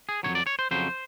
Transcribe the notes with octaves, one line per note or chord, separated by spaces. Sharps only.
G#4
C#3 F#3 C#5
F2
D5
C#5
C5
F2 C#3 F#3 C5